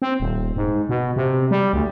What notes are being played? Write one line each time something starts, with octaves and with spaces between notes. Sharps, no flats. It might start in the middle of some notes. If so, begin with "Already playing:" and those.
C4
D#1
G#2
B2
C3
G3
D2